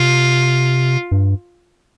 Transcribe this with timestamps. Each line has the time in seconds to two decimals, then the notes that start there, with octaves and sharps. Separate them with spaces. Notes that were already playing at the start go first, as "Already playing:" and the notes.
Already playing: C3 F4
1.12 G2